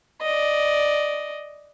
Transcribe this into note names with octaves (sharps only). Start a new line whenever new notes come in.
D5 D#5